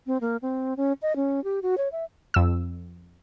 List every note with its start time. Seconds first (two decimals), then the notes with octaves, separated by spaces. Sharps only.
0.07 C4
0.21 A#3
0.42 C4
0.77 C#4
1.02 D#5
1.16 C#4
1.44 G4
1.62 F#4
1.78 C#5
1.92 E5
2.34 F2 E6